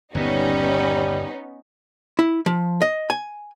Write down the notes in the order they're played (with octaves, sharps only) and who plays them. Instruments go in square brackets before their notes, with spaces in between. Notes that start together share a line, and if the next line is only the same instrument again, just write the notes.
[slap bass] G1 D#2 A#2 [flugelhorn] G3 [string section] B3 C#4 D#4
[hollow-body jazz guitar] E4
F3
D#5
G#5